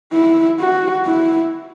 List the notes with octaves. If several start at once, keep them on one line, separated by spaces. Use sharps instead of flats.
E4
F#4
E4